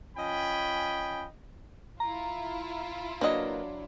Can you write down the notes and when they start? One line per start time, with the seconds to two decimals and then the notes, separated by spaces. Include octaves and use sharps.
0.16 F3 C#4 D#5 G5 G#5 B5
2.00 E4 F4 A#5
3.21 F#3 A#3 D4 B4 D#5